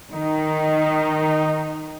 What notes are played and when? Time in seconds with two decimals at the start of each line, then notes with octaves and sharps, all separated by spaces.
0.12 D#3 D#4